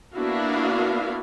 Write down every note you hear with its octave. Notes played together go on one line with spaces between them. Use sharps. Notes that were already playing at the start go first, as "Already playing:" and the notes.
A#3 B3 D4 E4 F#4 F5